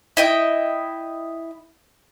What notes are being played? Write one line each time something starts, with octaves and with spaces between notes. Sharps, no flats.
E4 D#5 G5